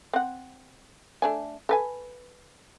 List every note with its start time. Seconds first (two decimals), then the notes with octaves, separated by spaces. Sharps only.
0.13 C4 F#5
1.22 A3 D4 G#5
1.69 A4 B4 G#5